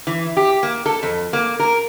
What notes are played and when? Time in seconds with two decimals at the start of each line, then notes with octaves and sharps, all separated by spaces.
0.07 E3
0.37 G4
0.63 A#3
0.86 A4
1.03 F2
1.33 A#3
1.60 A#4